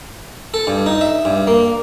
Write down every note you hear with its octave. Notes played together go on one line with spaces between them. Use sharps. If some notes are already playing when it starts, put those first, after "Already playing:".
A4
G2
D#4
E5
G2
A#3